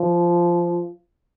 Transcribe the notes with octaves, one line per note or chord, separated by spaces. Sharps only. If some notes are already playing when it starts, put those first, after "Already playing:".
Already playing: F3